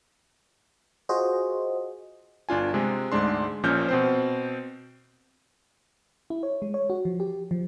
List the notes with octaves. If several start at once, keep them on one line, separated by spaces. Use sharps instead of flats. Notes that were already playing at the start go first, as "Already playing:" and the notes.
F4 F#4 G#4 C5 D#5
G1 D4 F4 G#5
C3 G#3
D2 G#2 G#3 D4 C6
A#1 A#2 F3 C#4 F6 G6
B2 C4 C5
E4
C#5
G#3
C#5
F#4
F3
G4
F3